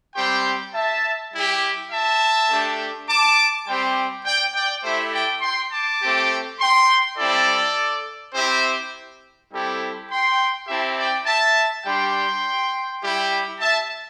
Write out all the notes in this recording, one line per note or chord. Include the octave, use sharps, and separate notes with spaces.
G3 C4 G4 G5 C6
E5 A5
G3 E4 G4
E5 A5
A3 D4 G4
A5 D6
G3 C4 G4 G5 C6
D5 G5
D5 G5
A3 E4 G4 C5 E5
D5 G5
G5 C6
A5 D6
A3 C4 G4
G5 C6
G3 C4 E4 A4 D5
C4 E4 G4 C5 E5
G3 C4 E4 G4 A4
G5 C6
C4 E4 G4 E5 A5
D5 G5
E5 A5
G3 D4 G4 G5 C6
G3 E4 G4
E5 A5